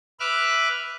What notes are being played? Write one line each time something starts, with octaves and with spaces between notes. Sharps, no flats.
B4 E5 D6 F6 F#6